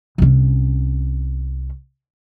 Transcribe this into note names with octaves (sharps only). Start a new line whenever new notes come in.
C2 C#4